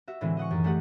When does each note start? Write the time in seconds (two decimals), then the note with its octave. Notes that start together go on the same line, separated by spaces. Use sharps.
0.08 F#4 E5
0.21 A2 D3 E3 G#3 C4
0.37 D#5 F#5 C#6
0.51 F#2 D#3
0.64 G#3 A3 D4 G4 G#4 F#5